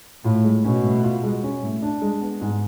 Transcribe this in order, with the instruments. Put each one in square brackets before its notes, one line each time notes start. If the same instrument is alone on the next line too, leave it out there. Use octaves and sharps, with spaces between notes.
[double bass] A2 [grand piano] F4
[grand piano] G#3
[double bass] B2 [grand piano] C#4
[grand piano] A2
F4
G#3
C#4
A2
D4
G#3
B3
G#2